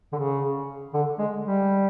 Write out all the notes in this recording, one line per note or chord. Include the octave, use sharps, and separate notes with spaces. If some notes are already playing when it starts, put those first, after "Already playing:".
D3
C#3
D3
G#3
G3